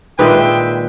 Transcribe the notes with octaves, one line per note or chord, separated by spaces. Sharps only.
A#2 D#3 G#3 B4 E5 G5